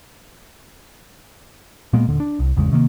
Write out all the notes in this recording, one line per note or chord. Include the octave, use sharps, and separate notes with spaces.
A#2 G#3 A#3 B3
D#1 D3
D4
C2
G#1 E2 C#3 G#3
C3 D#3 G3 A#3